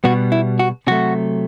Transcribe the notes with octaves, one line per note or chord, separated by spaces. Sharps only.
B2 G3 B3 F#4
E4
F#4
C3 F#3 A3 F#4